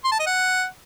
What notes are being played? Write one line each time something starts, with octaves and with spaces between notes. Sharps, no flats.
C6
A5
D#5
F#5